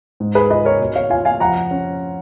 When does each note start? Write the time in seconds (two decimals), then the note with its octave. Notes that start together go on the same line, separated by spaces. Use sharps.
0.20 G#2
0.35 G#4 B4
0.50 F4 B4 D#5
0.65 A#4 C#5
0.81 B2
0.96 C#5 F5
1.10 F4 F5 G#5
1.25 F5 G#5
1.40 F2 F#5 A#5
1.71 C#4